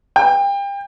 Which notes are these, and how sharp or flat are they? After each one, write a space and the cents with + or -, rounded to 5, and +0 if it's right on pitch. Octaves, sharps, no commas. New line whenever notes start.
G5 +30